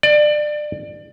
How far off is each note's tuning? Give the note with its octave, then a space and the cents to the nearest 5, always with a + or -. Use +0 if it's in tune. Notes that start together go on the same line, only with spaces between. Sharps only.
D5 +25